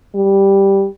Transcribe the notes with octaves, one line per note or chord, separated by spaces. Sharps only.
G3